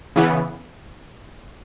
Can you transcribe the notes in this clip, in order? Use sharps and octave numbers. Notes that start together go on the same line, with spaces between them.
C#3 E3 B3